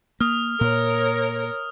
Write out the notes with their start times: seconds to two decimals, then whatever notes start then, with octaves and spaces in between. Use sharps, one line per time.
0.21 A#3 D#6 F6
0.61 A#2 A#4 C#5